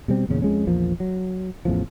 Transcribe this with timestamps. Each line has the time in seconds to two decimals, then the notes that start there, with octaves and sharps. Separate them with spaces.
0.08 B2 G3 C4
0.29 E2 A#2 C#3 C#4
0.42 F2 G#3 C#4
0.66 A#1 E2 F3 A#3
1.00 F#3
1.65 A1 E2 A2 F3